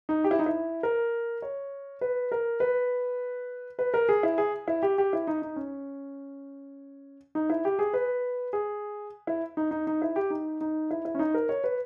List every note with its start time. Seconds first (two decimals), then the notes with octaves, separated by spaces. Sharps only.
0.09 D#4
0.24 G4
0.31 E4
0.39 D#4
0.46 E4
0.83 A#4
1.42 C#5
2.01 B4
2.32 A#4
2.60 B4
3.79 B4
3.94 A#4
4.09 G#4
4.23 E4
4.38 G#4
4.68 E4
4.83 G4
4.98 G4
5.13 E4
5.27 D#4
5.42 D#4
5.56 C#4
7.35 D#4
7.50 E4
7.65 G4
7.79 G#4
7.94 B4
8.53 G#4
9.27 E4
9.57 D#4
9.71 D#4
9.87 D#4
10.02 E4
10.16 G4
10.30 D#4
10.61 D#4
10.91 E4
11.05 E4
11.15 C#4
11.19 D#4
11.34 A#4
11.49 C#5
11.64 B4